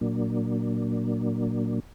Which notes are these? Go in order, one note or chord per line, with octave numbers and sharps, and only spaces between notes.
A#2 F#3 A#3 D4